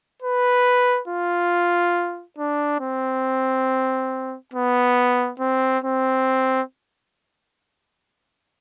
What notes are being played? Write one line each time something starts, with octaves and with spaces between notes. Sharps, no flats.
B4
F4
D4
C4
B3
C4
C4